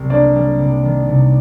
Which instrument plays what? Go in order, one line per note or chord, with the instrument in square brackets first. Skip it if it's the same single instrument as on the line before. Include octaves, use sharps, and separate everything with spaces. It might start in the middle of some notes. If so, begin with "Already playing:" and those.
Already playing: [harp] C2 G3
[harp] A#3 [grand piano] D4 D5
[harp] G3
C3
D#3
C3